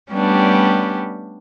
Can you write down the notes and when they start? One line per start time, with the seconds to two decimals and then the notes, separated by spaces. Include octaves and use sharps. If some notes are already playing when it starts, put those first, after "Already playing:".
0.12 G3 A3 B3 C#4 D4 G4